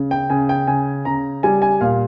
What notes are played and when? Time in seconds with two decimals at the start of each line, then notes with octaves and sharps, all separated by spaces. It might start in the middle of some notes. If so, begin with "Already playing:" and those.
Already playing: C#3
0.11 G5
0.30 C#3 G#5
0.49 G5
0.67 C#3 G#5
1.05 C#3 A#5
1.43 G3 G#5
1.62 G#5
1.81 A#2 F5